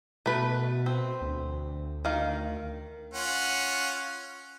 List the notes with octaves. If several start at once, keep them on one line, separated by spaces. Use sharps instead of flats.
B2 A3 B4
C4
D2
D#3 F5
C#4 F4 F#5